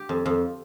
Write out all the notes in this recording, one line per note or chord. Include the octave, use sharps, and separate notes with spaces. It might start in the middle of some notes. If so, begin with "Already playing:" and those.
Already playing: G4
F2
F2